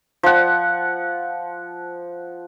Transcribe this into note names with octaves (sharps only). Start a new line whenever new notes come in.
F3 F#5